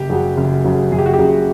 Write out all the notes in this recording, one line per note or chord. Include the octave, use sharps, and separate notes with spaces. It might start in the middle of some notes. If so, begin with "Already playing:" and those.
Already playing: F#1 G4
F#2 C#3 F#3
F#1
F#2 C#3 F#3
F#1 G#4
G4
F#4
G4
F#2 C#3 F#3